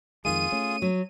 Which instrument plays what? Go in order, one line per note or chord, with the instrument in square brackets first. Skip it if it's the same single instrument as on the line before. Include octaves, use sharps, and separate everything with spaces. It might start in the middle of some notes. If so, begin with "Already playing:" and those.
[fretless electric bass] F2 D#3 G#3 [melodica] F4 G#4 [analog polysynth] D#7
[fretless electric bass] A3 C#4
[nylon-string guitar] F#3